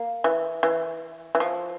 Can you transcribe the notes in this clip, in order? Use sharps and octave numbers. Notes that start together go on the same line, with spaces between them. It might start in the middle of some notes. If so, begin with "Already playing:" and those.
Already playing: A#3
E3
E3
E3
F3